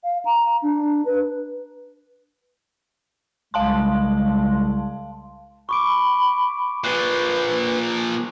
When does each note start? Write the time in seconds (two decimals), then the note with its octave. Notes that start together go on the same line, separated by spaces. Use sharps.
0.04 F5
0.25 A#5
0.62 D4
1.05 B4
3.54 C2 C#3 G#3 F5 A5 C6
5.69 B5 C#6 D6 D7
6.84 A#2 F3 B4 F#6 C7 G7